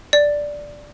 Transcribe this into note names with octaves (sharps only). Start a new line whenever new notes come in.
D5